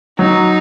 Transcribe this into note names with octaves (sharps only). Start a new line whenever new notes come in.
F#3 D#4